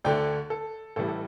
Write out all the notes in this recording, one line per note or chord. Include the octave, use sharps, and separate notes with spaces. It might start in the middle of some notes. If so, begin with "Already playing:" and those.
D2 D3 A3 D4 D5 G5
A4
A1 A2 E3 G3 A4
A4